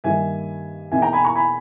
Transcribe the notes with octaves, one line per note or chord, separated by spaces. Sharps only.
G2 D#3 G3 A#3 E5 G#5
E2 B2 A#3 D#4 E5 G#5
G5 A#5
G#5 B5
A#5 C#6
G#5 B5